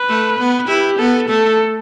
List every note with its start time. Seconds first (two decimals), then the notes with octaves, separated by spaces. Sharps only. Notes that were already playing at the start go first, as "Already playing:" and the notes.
Already playing: B4
0.09 A3
0.39 B3
0.68 E4 G4
0.99 B3 A4
1.29 A3 A4